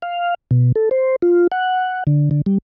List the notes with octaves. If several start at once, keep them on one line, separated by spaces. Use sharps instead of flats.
F5
B2
A4
C5
F4
F#5
D3
D3
G3